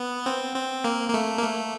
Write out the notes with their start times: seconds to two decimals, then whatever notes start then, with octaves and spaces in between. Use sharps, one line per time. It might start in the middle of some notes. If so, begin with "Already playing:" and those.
Already playing: B3
0.26 C4
0.56 C4
0.84 A#3
1.09 A#3
1.14 A3
1.38 A#3
1.42 A3